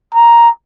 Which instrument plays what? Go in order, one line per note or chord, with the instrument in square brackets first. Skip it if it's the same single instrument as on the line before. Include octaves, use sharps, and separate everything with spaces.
[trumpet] A#5